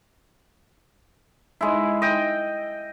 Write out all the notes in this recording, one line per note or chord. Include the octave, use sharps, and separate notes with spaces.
G#3 E4
D#5 G5